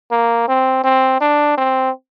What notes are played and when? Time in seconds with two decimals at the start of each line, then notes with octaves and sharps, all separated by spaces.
0.11 A#3
0.48 C4
0.84 C4
1.21 D4
1.58 C4